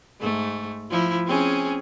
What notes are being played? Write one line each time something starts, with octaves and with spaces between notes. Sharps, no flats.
G#2 A3
F3 E4
C4 C#4 G#4